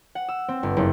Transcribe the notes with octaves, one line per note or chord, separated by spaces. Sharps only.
F#5
E6
C4
G1
F#1